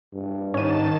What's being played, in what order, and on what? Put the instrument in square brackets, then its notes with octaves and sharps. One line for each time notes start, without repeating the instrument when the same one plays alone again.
[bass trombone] G2
[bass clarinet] G#2 [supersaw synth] D#3 A5 E7 [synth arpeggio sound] C#4 D#7